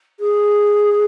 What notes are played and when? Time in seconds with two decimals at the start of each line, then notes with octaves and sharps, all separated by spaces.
0.20 G#4